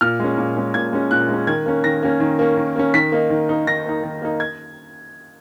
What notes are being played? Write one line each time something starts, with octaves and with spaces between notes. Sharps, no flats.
A#2 F6
G#3 C#4
A#2
G#3 C#4
A#2 G#6
G#3 C#4
A#2 F#6
G#3 C#4
D#3 G#6
A#3 C#4
D#3 A#6
A#3 C#4
D#3
A#3 C#4
D#3
A#3 C#4
D#3 B6
A#3 D#4
D#3
A#3 D#4
D#3 A#6
A#3 D#4
D#3
A#3 D#4
G#6